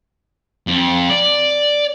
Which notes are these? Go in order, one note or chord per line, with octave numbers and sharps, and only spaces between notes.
F2
D5